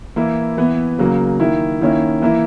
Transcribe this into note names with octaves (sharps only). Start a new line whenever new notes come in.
E3 A#3 E4
E3 B3 E4
C#3 F#3 A#3
D#3 A#3 E4
D#3 A#3 C#4 E4
E3 A#3 E4